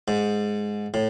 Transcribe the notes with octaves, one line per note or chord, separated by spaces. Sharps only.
G#2
A2